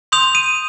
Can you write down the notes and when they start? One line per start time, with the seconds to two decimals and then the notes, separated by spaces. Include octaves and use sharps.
0.12 C6 D#6 G6 F7
0.35 D#7